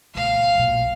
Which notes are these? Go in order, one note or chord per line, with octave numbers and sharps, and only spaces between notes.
C#2 A#2 F5
B1 A#2